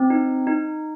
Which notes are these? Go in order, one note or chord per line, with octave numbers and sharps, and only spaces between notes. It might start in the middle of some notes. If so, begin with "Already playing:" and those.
Already playing: C4
D#4
D#4